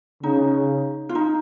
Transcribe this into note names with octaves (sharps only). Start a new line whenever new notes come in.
C#3 D#4
F4
D#4